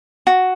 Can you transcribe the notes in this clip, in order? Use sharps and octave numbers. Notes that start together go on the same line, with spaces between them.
F#4